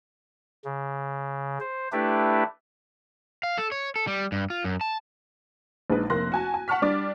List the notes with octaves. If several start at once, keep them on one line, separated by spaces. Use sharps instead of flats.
C#3
C5
A3 D4 E4 G4 B4
F5
A4
C#5
A4
G3
G2
F4
F#2
A5
A#1 G#3 D#4 B4
F1 A#3 C6 F#6 A#6
F#4 G#5 A5
G#5
F#5 A5 C#6 F6 B6
G3 D4 D6 A6